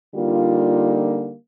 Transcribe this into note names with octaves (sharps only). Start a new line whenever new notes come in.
D3 G3 A#3 D#4 F4